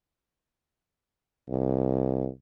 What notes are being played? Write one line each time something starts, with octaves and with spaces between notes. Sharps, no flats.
C2